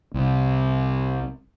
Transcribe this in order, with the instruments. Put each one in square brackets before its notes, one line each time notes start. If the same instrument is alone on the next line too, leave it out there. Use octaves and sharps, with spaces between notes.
[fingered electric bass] C2